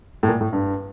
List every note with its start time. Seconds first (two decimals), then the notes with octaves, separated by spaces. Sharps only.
0.23 A2
0.28 A#2
0.41 A2
0.53 G2